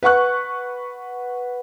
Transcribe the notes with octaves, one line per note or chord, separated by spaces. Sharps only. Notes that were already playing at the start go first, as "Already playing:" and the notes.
B4 F#5 C#6 F#6